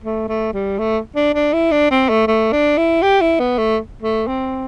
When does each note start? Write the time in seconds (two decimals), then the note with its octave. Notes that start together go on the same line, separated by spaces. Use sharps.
0.04 A3
0.28 A3
0.53 G3
0.79 A3
1.15 D4
1.34 D4
1.53 E4
1.72 D4
1.91 C4
2.09 A3
2.27 A3
2.52 D4
2.77 E4
3.02 G4
3.21 E4
3.40 B3
3.58 A3
4.02 A3
4.27 C4